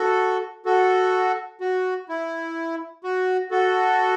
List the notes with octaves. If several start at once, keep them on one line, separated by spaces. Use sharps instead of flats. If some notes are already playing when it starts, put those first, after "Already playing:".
Already playing: F#4 A4
F#4 A4
F#4
E4
F#4
F#4 A4